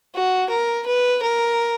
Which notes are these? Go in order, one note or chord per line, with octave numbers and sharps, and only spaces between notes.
F#4
A#4
B4
A#4